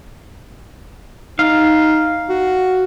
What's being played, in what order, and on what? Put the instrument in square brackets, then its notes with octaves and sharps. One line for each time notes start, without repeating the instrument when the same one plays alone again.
[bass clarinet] D#4 [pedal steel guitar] F5
[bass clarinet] F#4